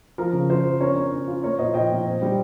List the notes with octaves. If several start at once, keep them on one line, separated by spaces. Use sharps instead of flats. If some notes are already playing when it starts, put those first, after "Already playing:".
F3 A#4
C#3
F3 C5
F3
C#4 A#4 C#5
C#4
C#4
F4
A#3 A#4 C#5
A#2 C5 D#5
A#2 D#5 G5
A#2
C4
G3